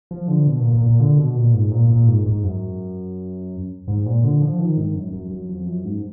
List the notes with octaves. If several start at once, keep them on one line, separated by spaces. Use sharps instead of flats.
F3
D3
B2
A#2
A#2
A#2
D3
B2
A#2
G#2
A#2
A#2
G#2
G#2
F#2
G#2
A#2
D3
F3
D#3
G#2
F#2
F#2
F#2
F2
F#2
G#2